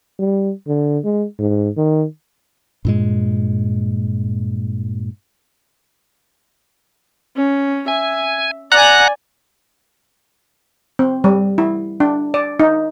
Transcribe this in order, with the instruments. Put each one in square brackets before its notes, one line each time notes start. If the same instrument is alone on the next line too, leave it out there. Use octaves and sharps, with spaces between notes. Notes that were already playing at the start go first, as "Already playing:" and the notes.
[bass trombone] G3
D3
G#3
G#2
D#3
[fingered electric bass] G2 A#2 G#3
[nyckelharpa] C#4
[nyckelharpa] E5 [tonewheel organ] G#5
[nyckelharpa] D5 G#5 [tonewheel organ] F#5 A#5 F#6
[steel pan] C4
G3
E4
D4
D5
D#4